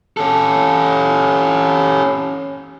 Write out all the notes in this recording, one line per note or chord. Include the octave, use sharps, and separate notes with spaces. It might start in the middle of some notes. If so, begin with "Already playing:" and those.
C#4 A4